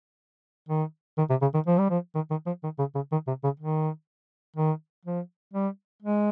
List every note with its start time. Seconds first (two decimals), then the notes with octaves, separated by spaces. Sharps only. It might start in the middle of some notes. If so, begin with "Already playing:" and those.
0.69 D#3
1.18 D#3
1.30 C3
1.41 C#3
1.54 D#3
1.66 F3
1.78 G3
1.90 F3
2.15 D#3
2.30 D#3
2.46 F3
2.64 D#3
2.79 C#3
2.95 C#3
3.12 D#3
3.27 C3
3.44 C#3
3.60 D#3
4.56 D#3
5.05 F3
5.53 G3
6.02 G#3